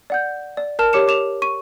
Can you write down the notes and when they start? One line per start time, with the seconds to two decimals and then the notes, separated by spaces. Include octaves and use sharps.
0.10 D5 F#5 G6
0.57 D5
0.79 A#4 A5 F6 E7
0.93 G4 C#5 D6 C#7 E7
1.08 D6 E7 F7
1.42 C#6 D#7